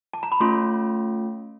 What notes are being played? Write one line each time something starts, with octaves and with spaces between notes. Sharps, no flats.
A5
A#5
B5
A3 C#4 F4 C6